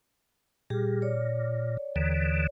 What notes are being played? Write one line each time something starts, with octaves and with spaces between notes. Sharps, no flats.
A#2 G3 G4 G#4
C#5 D5
D#2 D3 E3